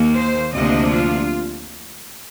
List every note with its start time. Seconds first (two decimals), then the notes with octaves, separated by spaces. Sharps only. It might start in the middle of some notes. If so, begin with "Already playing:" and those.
Already playing: D#2 D#3 A#3
0.16 C5
0.54 D2 C3 F3 A#3 D4 D#5
0.93 F4